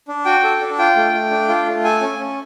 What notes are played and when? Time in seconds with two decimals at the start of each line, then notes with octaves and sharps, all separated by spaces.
0.08 D4
0.25 F#4 G5
0.43 A4
0.61 D4
0.78 F4 G5
0.96 A3
1.13 A3
1.31 D4
1.49 F4
1.66 A3
1.84 A4 G#5
2.01 C#4
2.19 C#4